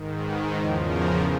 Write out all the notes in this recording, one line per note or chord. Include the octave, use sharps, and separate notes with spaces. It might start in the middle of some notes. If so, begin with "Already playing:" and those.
Already playing: G#2 D#3
B4
E2 C#3 F3 A#4
A#4